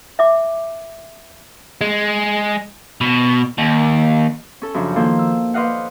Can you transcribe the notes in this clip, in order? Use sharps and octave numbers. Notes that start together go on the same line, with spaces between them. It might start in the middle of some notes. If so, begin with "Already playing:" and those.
E5 D6
G#3
B2
D#2
C#4 A4
F#2 C#3 F3 D4
D#3 F3 A#3 A4 C5
E6
B4 C5 D5 D#5 F5 F#5